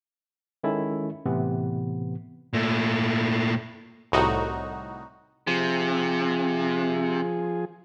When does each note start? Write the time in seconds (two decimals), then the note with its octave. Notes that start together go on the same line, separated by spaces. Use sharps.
0.64 D#3 G#3 C#4 E4 A4
1.26 A2 C3 E3 B3
2.53 A#2 A3
4.12 C2 A2 D#4 F#4
5.47 C3 F3 G#4